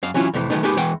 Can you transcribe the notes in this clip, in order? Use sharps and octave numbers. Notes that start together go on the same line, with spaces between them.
F#2 F5
E3 F#3 C#4 E4 F4
F2 A2 C3 E3
D#3 F#3 G#3 A3 B3 D#4
G#3 A#3 B3 D#4 G4 B4
E2 E3 G#3 B4 F#5 G5